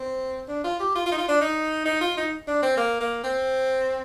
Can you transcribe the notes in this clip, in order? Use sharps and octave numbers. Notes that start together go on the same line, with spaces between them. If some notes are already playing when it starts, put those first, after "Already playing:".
Already playing: C4
D4
F4
G4
F4
F4
D#4
F4
D4
D#4
D#4
F4
D#4
D4
C4
A#3
A#3
C4